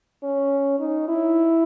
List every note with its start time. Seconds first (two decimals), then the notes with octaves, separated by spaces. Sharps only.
0.23 C#4
0.80 D#4
1.08 E4